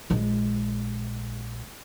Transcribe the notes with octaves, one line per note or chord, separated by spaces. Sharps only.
A#1 G#3